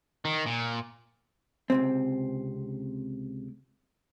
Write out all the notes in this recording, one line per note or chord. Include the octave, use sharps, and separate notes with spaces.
D#3
A#2
C#2 C3 C4